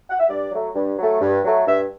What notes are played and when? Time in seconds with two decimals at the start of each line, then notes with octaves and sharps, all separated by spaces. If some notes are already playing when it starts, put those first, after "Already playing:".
0.10 F#5
0.20 E5
0.29 G2 D5
0.52 F#3 A3
0.75 G2
0.98 F#3 A3
1.21 G2
1.44 F#3 A3
1.67 G2 E5